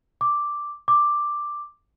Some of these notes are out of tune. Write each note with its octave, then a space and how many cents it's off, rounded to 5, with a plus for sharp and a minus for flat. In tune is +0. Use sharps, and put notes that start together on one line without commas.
D6 +0
D6 +5